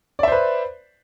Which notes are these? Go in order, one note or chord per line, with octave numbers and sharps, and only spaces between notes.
B4 C5 D5 E5